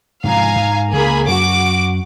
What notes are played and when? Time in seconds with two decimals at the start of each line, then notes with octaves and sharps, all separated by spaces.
0.24 G#2 C3 F3 F5 G#5 A#5
0.56 G#2
0.92 C#2 A#3 G#4 B5
1.28 F#2 F#4 D6 D7